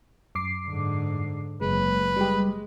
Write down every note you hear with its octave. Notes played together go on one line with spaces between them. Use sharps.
F#2 D6 C7
G#2 D3
F#1 G#3 B4
G3 G#3 G4